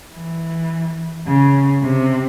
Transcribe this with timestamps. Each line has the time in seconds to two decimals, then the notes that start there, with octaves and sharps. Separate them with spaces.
0.14 E3
1.27 C#3
1.83 C3